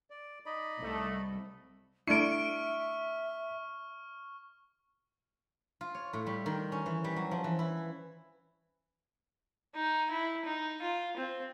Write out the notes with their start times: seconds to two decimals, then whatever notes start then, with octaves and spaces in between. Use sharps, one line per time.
0.10 D5
0.46 D#4 D5 D#5 B5
0.81 C2 A3
2.07 A3 D4 E4 E5 C#6 F6 C#7 D7
5.81 F4
5.95 C#5
6.13 A2
6.27 G3
6.46 D#3
6.72 C#4
6.86 E3
7.04 G3
7.16 F#3
7.31 F3
7.44 E3
7.59 E4
9.75 D#4
10.11 E4
10.45 D#4
10.82 F4
11.17 C4